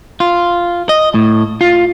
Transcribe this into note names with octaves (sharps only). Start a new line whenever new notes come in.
F4
D#5
A2
F4